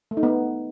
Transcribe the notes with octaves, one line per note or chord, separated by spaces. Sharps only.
A3
D#4
B3